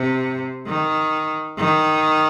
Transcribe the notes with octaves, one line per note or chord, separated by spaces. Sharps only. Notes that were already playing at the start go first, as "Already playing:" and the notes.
Already playing: C3
D#3
D#3